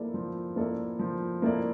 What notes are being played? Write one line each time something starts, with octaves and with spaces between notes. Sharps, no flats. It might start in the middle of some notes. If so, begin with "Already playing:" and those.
Already playing: F3 A#3 E4 A4 D5
F3
A#3 E4 A4 D5
F3
A#3 E4 A4 D5